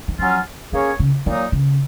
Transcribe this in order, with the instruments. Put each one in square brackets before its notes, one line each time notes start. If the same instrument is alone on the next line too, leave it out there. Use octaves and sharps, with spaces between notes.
[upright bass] D#3
[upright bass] F3 [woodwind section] F#3 C#4 F4
[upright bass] D#3 [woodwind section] A#3 C#4 G#4 C#5
[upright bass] C#3
[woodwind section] A#2 F#3 A#3 D#4 [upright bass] D#3
[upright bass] C#3